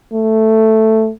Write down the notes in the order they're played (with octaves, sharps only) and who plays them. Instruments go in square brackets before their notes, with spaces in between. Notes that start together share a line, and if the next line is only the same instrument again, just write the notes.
[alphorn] A3